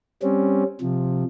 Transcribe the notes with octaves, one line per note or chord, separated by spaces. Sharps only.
G3 C4 C#4
C3 F3